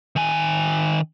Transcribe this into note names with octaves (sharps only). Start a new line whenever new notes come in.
D#3 G#5